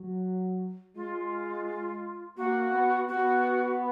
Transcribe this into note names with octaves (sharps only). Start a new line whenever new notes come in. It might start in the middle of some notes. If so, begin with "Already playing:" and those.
Already playing: F#3
G#3 F4
A#3 F#4
B3
B3 F#4